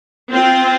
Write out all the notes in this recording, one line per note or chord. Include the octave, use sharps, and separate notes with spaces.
C4 F4 C5